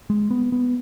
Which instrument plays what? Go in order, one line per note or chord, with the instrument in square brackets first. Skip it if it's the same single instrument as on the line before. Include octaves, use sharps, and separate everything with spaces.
[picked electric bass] G#3
B3
B3